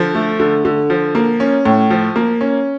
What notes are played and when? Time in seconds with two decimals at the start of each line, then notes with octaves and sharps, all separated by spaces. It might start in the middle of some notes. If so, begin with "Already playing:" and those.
Already playing: D3 F3
0.15 A3
0.40 D3
0.65 D3
0.90 F3
1.15 A#3
1.40 C#4
1.65 A2
1.90 F3
2.16 A#3
2.41 C#4